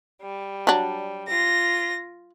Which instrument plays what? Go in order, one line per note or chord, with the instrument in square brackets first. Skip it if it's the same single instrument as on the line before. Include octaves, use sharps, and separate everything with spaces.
[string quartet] G3
[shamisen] F#3 D4
[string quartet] F4 A#6